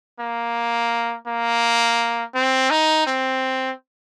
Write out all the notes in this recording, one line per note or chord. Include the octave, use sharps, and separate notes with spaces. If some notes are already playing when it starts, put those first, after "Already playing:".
A#3
A#3
C4
D#4
C4